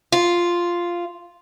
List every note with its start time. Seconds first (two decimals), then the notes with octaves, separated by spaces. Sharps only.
0.12 F4